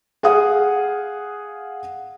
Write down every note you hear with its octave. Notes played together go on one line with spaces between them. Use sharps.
G#4 F5 F#5 D#6